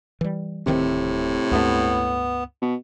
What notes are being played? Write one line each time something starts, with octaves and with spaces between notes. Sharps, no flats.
E3 G3
D1 A2 C3 D#3 C4
C#2 G2 A3 B3
B2